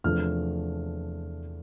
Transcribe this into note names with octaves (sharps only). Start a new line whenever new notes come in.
E2 C3 F3 A3 D4 F6